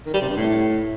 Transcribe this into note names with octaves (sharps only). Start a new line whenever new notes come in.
D#3
G3
C3
G2
A2